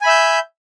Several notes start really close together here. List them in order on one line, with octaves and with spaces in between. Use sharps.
G#5 B5 E5 G6